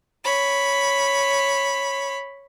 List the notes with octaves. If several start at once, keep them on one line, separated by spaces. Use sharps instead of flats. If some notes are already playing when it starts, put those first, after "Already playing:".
C#5 B5